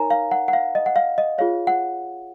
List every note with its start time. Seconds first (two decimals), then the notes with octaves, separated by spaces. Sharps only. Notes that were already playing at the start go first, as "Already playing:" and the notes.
Already playing: D#4 A#4 C#5 G#5 A#5
0.11 F5
0.31 F#5
0.48 F#5
0.53 F5
0.75 D#5
0.86 F#5
0.96 F5
1.18 D#5
1.38 F4 G#4 C#5 F5
1.67 F#5